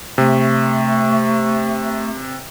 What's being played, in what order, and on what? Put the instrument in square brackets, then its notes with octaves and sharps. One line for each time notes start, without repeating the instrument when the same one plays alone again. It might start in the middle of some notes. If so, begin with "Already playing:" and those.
[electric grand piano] C3 [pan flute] A3